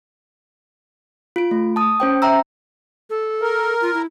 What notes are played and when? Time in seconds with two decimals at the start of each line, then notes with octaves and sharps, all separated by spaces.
1.36 F4 D7
1.51 A3
1.76 A5 D#6
2.00 C#4 C5 G5
2.22 E5 G5 A#5 E6
3.10 A4
3.42 A#4
3.81 F4
3.94 E4